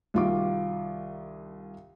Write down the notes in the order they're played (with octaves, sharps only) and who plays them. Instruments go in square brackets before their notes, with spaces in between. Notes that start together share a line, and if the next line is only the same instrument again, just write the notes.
[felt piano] C2 D#3 F4 F#4 D6